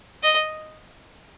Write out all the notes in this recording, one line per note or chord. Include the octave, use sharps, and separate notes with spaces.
D#5